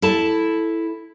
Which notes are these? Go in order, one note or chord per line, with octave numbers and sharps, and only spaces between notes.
E4 A4 A5